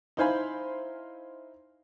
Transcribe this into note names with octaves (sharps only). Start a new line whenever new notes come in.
D#4 E4 C5 F5 G#5 B5